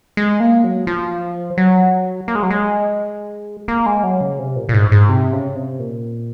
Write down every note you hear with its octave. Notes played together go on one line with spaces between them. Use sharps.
G#3
A#3
F#3
F3
F#3
A#3
G#3
F#3
G#3
A#3
G#3
F#3
C#3
C3
A#2
A#2
G#2
G#2
C3
C#3
C3
A#2